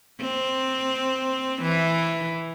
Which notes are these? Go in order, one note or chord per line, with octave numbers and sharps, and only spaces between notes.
C4
E3